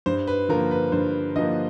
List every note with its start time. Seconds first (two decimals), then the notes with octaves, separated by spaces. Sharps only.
0.06 G2 C5
0.27 B4
0.49 D3 F3 A#3 A#4
0.71 B4
0.92 G2 C5
1.36 D3 F3 A#3 D#5